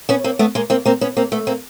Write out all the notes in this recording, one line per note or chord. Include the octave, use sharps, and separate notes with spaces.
B3 C#4
A#3 C4
A3 B3
G#3 A#3
A#3 C4
A#3 C4
B3 C#4
A#3 C4
A3 B3
A#3 C4